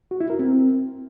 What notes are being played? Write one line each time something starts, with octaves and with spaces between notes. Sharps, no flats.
F#4
E4
A#4
C4